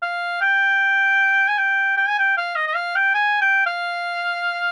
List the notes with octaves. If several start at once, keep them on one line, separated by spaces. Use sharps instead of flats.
F5
G5
G#5
G5
G5
G#5
G5
F5
D#5
D#5
F5
G5
G#5
G5
F5